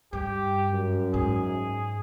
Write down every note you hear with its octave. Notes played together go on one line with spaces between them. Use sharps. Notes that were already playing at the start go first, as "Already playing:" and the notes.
G2 G4
F#2
G#2 G#4